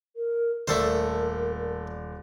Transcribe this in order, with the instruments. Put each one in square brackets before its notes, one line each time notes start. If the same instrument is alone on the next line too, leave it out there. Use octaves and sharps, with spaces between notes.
[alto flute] A#4
[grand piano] D#1 D5 [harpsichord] A3 A4 C5 [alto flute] A#4